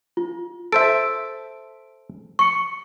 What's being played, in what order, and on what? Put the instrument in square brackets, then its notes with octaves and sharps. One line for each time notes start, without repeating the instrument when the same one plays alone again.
[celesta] F4
[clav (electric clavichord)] A4 C5 E5 [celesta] D7
[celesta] C#6 C#7